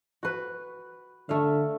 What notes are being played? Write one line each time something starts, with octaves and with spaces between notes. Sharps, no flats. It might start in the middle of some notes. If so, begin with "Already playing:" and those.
F#4 B4
D3 A3 E5 F5